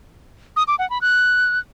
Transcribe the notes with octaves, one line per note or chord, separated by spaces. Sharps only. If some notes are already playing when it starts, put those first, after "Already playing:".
D#6
D6
F#5
B5
F#6